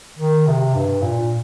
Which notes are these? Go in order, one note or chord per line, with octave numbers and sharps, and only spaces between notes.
D#3
C3
G2
A#2